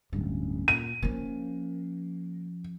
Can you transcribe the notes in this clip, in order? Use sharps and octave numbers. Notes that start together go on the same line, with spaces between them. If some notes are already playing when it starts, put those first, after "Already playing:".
D1 G2 C#4
A#2 D#7
F3 A#3 C#4